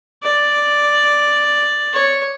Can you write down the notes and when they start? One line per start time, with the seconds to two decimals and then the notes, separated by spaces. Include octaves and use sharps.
0.24 D5
1.94 C#5